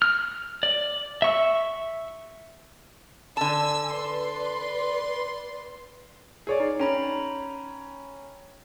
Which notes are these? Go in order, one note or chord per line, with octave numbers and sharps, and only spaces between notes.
F6
D5
E5 C#6 E6
D3 G#5 A5 E6
B4 D5 C6
G#4 C#5 D5
D#4
C#4 G5 A#5 B5